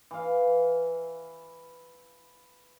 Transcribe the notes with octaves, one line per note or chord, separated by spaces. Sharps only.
E3 F5